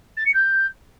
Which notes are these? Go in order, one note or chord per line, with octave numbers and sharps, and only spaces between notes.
A6
C#7
G6